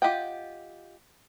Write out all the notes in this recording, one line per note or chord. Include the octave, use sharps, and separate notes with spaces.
F4 G4 D#5 F#5 G5